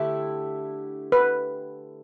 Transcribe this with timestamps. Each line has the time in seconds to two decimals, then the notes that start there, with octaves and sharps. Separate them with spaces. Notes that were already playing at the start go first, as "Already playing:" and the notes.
Already playing: D3 A3 E4 G4
1.12 B4